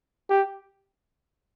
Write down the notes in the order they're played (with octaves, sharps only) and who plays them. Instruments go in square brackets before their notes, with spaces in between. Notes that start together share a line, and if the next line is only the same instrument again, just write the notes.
[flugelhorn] G4